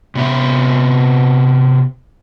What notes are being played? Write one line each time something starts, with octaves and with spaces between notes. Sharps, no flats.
C3 B3 E5